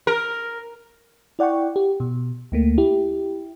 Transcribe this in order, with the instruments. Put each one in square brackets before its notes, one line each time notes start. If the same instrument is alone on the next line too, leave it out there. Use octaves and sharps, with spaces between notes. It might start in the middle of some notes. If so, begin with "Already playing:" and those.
[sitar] A#4
[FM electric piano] E4 D5 F#5 G5 C#6
G4
B2
D2 A3 A#3
E4 G4